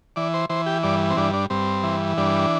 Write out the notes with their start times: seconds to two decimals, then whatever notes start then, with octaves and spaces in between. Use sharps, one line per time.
0.16 E3 D5
0.34 C5
0.49 E3 C5
0.66 G4
0.83 G2 D5
1.10 C4
1.17 G2 D4
1.33 D4
1.50 G2 C4
1.83 E3
2.17 G2 D4